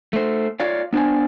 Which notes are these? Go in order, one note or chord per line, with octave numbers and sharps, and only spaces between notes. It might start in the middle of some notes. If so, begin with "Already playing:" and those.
A3 C5
F4 C#5 D5 F5
B3 D4 C5 D5 G#5